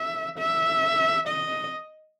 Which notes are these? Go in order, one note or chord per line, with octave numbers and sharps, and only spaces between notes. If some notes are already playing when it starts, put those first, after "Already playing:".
Already playing: E5
E5
D#5